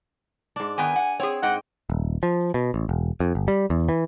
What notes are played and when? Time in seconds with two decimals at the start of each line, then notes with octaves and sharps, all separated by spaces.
0.56 G#2 D4
0.78 D#3 B3 G5 G#5
0.96 F#5
1.20 C4 G#4 C#5
1.43 G#2 D#5 F#5 G5
1.90 D#1
2.23 F3
2.54 B2
2.74 A1
2.89 E1
3.20 F2
3.35 G1
3.48 G3
3.70 E2
3.89 E3